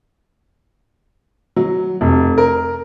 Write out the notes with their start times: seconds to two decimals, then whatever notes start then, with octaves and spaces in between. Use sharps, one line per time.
1.56 F#3
2.01 F1
2.38 A#4